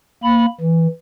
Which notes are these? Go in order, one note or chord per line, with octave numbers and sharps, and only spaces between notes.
A#3 B5
E3